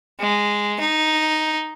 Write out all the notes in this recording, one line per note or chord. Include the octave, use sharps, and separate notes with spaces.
G#3
D#4